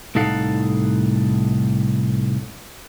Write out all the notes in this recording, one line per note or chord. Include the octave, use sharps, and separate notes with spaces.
C2 A2 D#4 A4 F5 F#5